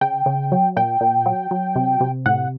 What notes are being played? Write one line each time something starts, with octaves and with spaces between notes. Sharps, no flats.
C#3 G5
C#3
F#3
A#2 G5
A#2
F#3
F#3
C3
C3
A2 F#5